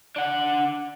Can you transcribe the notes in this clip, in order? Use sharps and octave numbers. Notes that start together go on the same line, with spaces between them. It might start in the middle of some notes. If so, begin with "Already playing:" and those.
D4 F#5